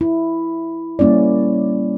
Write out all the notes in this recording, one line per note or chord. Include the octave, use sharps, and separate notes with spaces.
E4
G3 A#3 C#4 E4 D5